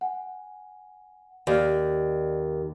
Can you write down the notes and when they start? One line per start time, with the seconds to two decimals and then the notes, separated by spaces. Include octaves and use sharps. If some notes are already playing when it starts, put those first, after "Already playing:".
0.01 F#5 G#5
1.47 D#2 D5 D#5 F6